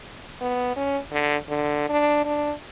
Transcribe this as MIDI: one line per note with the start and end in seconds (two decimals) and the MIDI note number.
0.41 0.71 59
0.76 0.98 61
1.12 1.36 50
1.49 1.88 50
1.89 2.25 62
2.25 2.52 62